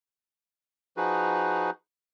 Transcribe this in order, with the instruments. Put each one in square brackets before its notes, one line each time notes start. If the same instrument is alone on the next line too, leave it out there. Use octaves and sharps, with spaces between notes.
[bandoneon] F3 D#4 F#4 G#4 B4